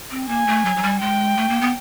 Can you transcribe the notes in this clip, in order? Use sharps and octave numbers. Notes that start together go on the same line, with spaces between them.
C4
A#3 G#5
A3
F#3
F#3
G3
G#3 G5
A3
A#3
B3